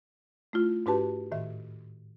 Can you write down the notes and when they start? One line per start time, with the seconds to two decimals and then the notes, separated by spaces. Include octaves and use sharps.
0.53 A3 E4 F4
0.86 G#2 D4 F#4 G4 B4 A5
1.32 A2 D#3 E5